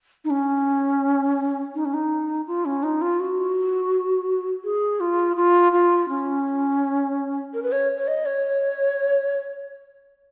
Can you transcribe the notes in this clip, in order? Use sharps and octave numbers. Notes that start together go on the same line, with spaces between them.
D#4
C#4
D#4
C#4
D#4
F4
C#4
D#4
F4
F#4
G#4
F4
F4
F4
C#4
A#4
B4
C#5
C#5
D#5
C#5